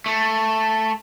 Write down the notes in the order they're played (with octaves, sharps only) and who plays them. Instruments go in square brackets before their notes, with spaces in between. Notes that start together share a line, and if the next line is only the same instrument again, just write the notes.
[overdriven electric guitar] A3